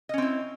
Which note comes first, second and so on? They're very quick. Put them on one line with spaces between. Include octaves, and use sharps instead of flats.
D#5 C#4 C4 E4